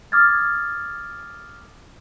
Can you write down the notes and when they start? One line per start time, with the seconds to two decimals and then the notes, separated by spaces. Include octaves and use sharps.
0.12 D6 D#6 F6 G#6 A6